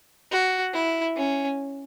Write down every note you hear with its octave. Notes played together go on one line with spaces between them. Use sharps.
F#4
E4
C#4